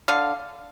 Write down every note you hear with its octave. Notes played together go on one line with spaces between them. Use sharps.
D3 F5